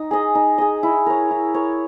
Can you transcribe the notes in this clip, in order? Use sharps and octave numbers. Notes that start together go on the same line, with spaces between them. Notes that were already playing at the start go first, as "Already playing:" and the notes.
Already playing: D#4
G#4 D#5
D#4
G#4 D#5
E4
A#4 C#5
E4
A#4 C#5